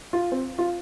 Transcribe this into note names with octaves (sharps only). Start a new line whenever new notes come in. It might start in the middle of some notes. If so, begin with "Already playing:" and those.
F4
C4
F4